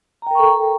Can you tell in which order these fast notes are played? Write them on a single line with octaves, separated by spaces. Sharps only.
A#5 G5 A#4 C#6 A4